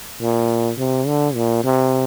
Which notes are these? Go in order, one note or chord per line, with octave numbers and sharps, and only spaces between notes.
A#2
C3
D3
A#2
C3